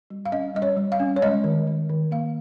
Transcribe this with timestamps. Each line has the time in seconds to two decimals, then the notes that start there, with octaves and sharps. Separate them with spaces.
0.10 G3
0.25 F5
0.32 C#4 D#5
0.55 G3 D#5
0.62 C#5
0.77 G3
0.92 F5
1.00 C#4
1.16 C#5
1.22 G#3 D#5
1.44 D#3
1.67 D#3
1.89 D#3
2.11 A#3 F5